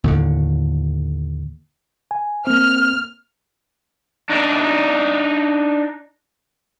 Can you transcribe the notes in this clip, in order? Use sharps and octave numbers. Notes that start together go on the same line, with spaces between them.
D#2 A2 D3
G#5
A#3 C4 F6
D4 D#4